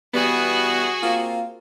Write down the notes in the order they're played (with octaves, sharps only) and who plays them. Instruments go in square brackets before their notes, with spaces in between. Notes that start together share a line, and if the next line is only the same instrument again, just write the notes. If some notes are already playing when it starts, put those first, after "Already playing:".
[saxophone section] E3 G3 B3 [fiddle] F#4 G#4
[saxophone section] A#3 C4 F4